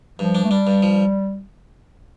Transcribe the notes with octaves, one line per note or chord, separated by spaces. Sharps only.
G2 F3
D4
A3
G3 D4
G2
F3